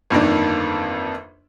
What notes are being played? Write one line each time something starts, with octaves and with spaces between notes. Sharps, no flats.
G1 F2 D#3 A#3 D4